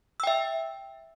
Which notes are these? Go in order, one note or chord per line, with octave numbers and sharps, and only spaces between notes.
E5 G5 E6